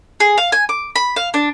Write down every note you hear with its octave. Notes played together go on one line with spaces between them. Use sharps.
G#4
F5
G#5
D6
B5
F5
D4